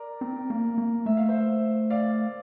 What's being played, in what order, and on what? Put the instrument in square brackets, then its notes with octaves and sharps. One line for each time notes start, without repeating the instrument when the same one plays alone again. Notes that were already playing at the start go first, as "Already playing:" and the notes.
Already playing: [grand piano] A#4 D5
[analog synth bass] C4
A#3
A#3
[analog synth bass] A3 [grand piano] E5
[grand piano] F5
C5 E5
D5 F5